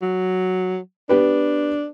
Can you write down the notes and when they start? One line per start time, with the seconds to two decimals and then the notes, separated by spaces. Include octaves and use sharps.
0.02 F#3
1.09 B3 D4 G4 B4